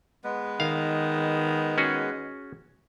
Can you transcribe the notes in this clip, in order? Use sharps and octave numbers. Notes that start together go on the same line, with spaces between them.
G#3 B3 B4
D#3 F5
C#4 F#4 G#4